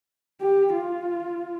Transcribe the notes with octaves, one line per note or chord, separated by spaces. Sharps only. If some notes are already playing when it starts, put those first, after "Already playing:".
G4
F4